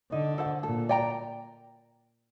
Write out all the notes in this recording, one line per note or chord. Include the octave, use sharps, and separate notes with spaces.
D3 D#4
A4 C5 F#5
A#2 A4
D5 G5 A#5